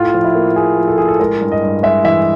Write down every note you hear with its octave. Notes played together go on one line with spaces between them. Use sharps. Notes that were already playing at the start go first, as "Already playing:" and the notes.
Already playing: A2 F4
F3
E4
A#3
A#3 G#4
F3
A4
A2 G#4
A4
G#3 A#4
G2
D#5
G2
G#3 E5
E3 E5